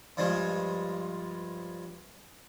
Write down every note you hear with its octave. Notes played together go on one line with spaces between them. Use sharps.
G2 F3 G3 G#3